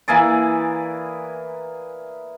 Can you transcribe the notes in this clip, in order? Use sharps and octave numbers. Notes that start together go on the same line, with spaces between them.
E3 A#3 G#4 D5